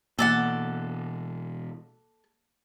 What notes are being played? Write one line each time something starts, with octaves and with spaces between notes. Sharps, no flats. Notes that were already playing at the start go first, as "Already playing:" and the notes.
B2 E3 A#3 A4 D5 F#5